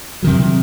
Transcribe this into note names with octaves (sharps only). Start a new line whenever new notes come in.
C3 D#3 F#3